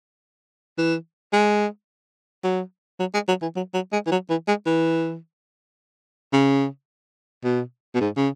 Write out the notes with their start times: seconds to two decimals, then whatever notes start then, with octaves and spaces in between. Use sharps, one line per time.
0.78 E3
1.33 G#3
2.44 F#3
3.00 F#3
3.14 G#3
3.28 F#3
3.42 E3
3.56 F#3
3.74 F#3
3.93 G#3
4.07 E3
4.11 F#3
4.30 E3
4.48 G#3
4.66 E3
6.33 C#3
7.44 B2
7.95 B2
8.01 G#2
8.17 C#3